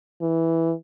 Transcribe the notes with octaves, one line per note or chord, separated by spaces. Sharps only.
E3